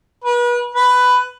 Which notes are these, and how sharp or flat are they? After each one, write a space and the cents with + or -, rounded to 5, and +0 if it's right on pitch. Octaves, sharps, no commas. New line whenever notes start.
B4 -35
B4 +10